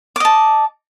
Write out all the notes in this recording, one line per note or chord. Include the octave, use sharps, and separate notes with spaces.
D#5 A5 D6